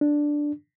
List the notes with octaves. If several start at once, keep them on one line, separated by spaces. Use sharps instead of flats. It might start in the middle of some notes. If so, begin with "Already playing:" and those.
D4